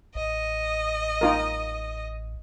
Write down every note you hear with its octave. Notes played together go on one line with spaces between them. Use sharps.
A1 D#5
D#4 F4 A#4